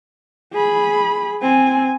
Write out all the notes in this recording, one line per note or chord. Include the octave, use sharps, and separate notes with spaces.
G#4 B5
C4 G#5